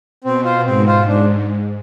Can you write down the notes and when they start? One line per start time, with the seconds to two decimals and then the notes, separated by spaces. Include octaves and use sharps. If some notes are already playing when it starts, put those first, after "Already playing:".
0.24 B2 C4
0.45 F4 C5
0.66 G#2 C4
0.87 F4 C5
1.08 D4